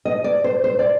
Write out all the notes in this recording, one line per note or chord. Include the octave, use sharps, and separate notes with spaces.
D#5
D5
C5
C5
D5